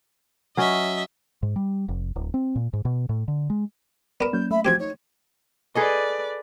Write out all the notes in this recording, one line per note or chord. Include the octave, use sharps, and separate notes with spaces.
F#3 C#4 D#5 E5
G#2
G3
F1
D1
C4
A#2
G#2
B2
A2
D3
G#3
B3 A#4 D5 B5 E7
F#3 A#3 C#4 G6
A3 E5 B5
F3 C4 F#4 G4 G#6
D#4 C#5
G#4 A4 B4 D5 D#5